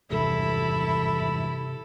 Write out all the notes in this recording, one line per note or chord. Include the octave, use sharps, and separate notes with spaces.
G#1 E2 G2 C3 E4 A4